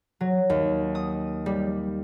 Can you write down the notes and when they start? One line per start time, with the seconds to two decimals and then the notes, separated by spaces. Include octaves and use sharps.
0.21 F#3
0.50 D#2
0.95 D#6
1.46 G3